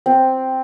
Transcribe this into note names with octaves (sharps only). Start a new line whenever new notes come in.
C4